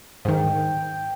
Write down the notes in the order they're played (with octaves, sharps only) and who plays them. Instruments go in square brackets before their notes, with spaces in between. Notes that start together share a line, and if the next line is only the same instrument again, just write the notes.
[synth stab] G#2 D#3 [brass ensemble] G5